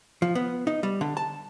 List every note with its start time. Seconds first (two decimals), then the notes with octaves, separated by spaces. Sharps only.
0.22 F3
0.35 B3
0.67 D#4
0.83 G3
1.01 D3
1.17 A5